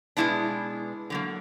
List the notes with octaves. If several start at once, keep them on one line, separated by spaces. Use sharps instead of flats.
B2 G#3 B3 D4 E4
D3 F#3 A#3